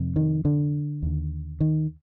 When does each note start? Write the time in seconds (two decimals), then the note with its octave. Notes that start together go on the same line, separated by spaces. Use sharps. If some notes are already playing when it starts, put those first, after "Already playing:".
Already playing: F2 C3
0.16 D#3
0.45 D3
1.02 D#2 D3
1.60 D#3